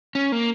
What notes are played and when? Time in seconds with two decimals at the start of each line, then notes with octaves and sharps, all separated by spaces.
0.15 C#4
0.32 A#3